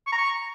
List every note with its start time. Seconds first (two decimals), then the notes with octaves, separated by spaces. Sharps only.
0.07 C#6
0.12 A#5
0.18 C#6